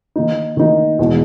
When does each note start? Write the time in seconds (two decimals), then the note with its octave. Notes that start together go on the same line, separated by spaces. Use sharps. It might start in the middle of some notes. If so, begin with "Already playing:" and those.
0.16 D#3 A#3 D#4
0.57 D#3 A#3 D#4
0.99 E2 B2 G#3